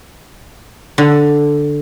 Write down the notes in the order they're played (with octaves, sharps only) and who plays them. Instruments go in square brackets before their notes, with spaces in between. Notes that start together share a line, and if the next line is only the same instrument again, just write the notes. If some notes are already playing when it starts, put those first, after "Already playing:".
[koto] D3